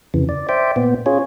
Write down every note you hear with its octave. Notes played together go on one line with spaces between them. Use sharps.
F2 C#3 E3
D5
C5 D5 E5 G5
A#2 B3
C#4 F4 G#4 C#5